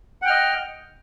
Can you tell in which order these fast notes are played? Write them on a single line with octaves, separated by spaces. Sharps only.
F#5 G5 F6 D#5